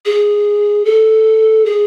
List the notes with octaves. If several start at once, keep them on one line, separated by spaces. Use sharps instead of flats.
G#4
A4
G#4